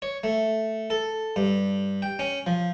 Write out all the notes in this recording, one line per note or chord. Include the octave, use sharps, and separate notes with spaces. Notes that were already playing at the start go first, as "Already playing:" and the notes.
C#5
A3
A4
G2
G5
C#4
F3